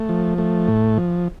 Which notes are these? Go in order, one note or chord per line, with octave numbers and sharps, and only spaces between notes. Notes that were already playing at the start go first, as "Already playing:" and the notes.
Already playing: A3
F3
A3
A2
F3